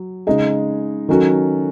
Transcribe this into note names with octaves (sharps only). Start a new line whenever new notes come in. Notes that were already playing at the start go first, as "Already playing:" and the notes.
Already playing: F#3
C#3 G#3 D#4 G#4
D#3 F#3 C#4 F#4 A4